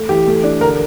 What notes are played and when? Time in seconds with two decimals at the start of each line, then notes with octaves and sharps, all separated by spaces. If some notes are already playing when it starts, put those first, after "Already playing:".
Already playing: A3
0.09 E3 G4
0.27 A3
0.44 D4
0.61 D3 A#4